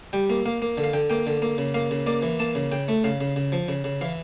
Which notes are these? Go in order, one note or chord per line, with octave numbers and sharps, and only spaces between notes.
G3 G5
A#3
A#3 F5
A#3
D3
F5
D3 G5
A#3 G5
D3
A#3
C#3
A#3 F5
C#3
A#3 D5
E3
A#3 A5
C#3
C#3 G5
A3
C#3 F5
C#3
C#3
F3
C#3
C#3
E3 F5